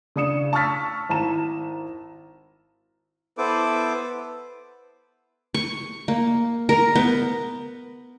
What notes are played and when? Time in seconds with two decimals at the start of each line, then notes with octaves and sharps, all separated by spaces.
0.16 C#3 D4 D#6 C#7 E7
0.53 A5 C#6 E6 F6 A6 B6
1.09 G#1 E4 A5 A#5 E7
3.38 B3 E4 A4 B4 C5 D6
5.54 C#6
6.08 A#3
6.69 A#4
6.95 B3